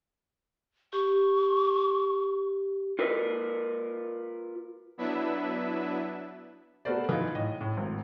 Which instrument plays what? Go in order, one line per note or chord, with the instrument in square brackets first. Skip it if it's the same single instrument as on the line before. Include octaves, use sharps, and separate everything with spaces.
[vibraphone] G4 [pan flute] C#6
[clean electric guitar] F4 A#4 B4
[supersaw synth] F#3 B3 D4 E4 B4 E5
[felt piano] A3 B3 F#4 A#4 C5 D5
E3 D#4 F4
A2 D#5
A2
G#1